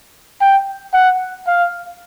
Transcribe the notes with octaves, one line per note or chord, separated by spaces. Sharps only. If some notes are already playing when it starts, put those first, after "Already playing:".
G5
F#5
F5